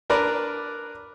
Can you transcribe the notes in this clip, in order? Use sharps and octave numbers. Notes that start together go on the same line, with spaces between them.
D4 A#4 B4 D5